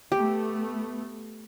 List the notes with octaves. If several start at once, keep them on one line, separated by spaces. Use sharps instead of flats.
A3 B3 G4